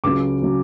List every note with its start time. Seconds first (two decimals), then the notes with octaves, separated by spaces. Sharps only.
0.04 C#2 C#3 F#3 D6
0.42 C#3 F#3